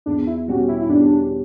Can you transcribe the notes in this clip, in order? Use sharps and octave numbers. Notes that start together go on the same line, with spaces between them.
E2 D4
E4
B2 G3 C#4 F#4 G4
E4
E4
E2 D4